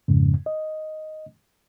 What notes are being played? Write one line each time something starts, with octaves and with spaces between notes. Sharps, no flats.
F2 G#2 C#3
D#5